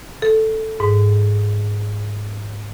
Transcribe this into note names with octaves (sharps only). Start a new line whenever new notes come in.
A4
G#2